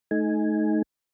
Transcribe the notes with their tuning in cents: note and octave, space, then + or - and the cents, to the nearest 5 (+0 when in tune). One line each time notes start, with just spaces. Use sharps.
A3 -25 D#4 +10 G#5 +0